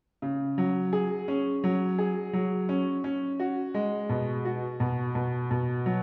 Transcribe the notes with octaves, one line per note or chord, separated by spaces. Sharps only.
C#3
F#3
G#4
C#4
F#3
G#4
F#3
C#4
C#4
F#4
G#3
B2
F#4
B2
B2
B2
F#3